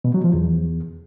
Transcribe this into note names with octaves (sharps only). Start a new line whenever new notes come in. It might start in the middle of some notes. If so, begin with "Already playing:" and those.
B2
F#3
F3
E2